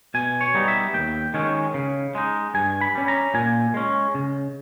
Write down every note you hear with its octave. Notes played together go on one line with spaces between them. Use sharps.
B2 G#5
C#5
G3 B3 D#4
E5
D#2 G5
D#3 G#3 C#4
C#3
G#3 D#4
G2 G#5
B5
G3 C#4
A#5
A#2 G#5
G#3 C#4
C#3